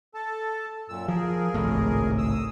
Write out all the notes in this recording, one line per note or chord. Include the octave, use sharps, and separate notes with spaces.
A4 A5
F#2 A#2 E6
F3 G#4 A#4
G#1 C#2 A2
D#6 E6